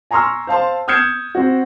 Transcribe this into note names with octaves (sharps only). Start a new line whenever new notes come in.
G#5 A#5 C6 C#6 E6 F6
C5 F5 A5 C6
D#6 F6 G6 G#6 C#7 E7
C4 F#4